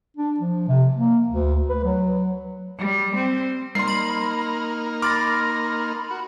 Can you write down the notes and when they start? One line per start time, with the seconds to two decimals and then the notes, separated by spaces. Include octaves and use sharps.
0.17 D4
0.40 F3
0.68 C3
0.97 A#3
1.29 D2
1.69 B4
1.84 F#3
2.78 G3
3.16 C4
3.75 G3 A#3 D#4 A#4 C6 C7
3.87 B5
5.02 B5 C6 D6 F6 A6 A#6
6.11 F#4